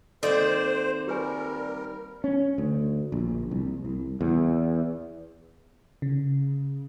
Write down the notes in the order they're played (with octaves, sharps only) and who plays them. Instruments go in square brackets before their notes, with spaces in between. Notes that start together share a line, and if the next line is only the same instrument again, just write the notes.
[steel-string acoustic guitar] D#3 A#3 C4 [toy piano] A4 D#5 [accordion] C5 [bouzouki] D5
[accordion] G3 A#4 [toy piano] G4 B4 G#5
[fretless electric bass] C#4
D2
A#1
C2
C2
E2
[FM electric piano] C#3